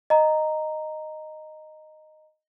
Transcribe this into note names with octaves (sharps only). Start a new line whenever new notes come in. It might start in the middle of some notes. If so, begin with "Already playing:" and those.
D#5 A#5